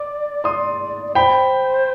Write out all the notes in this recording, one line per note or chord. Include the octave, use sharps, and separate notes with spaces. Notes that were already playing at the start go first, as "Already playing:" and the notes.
Already playing: D5 D6
C6 D#6
D5
C5 G5 B5